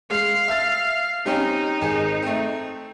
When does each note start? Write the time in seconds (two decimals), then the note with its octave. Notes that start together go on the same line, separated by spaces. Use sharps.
0.11 G#3 F5 C7
0.48 E5 E6 A6
1.26 G3 C4 C#4 D#4
1.81 G#1 G#4
2.22 A3 C4